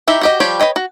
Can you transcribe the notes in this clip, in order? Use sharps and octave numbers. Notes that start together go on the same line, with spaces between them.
D#4 E4 G4 E5
F#4 G4 D#5
F3 G3 G4 C#5 D5
B4 C#5 D#5 G5
F#4